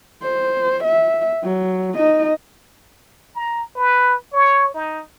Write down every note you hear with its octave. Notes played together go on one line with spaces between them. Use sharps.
C5
E5
F#3
D#4 D#5
A#5
B4
C#5
D#4